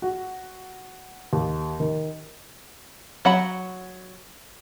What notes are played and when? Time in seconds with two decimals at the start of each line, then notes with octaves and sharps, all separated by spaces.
0.02 F#4
1.33 D#2
1.80 D#3
3.25 F#3 F#5 B5